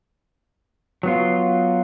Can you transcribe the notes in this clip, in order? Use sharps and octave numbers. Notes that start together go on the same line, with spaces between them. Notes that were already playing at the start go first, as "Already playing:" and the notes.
F#3 B3 F4